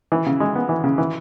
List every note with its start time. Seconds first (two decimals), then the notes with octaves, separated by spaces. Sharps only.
0.12 E3
0.26 C#3
0.40 G#3
0.55 B3
0.69 E3
0.84 C#3
0.98 E3